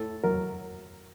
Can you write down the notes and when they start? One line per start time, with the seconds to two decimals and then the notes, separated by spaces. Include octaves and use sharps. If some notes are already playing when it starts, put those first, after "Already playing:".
Already playing: A2 A4
0.24 F#3 A#4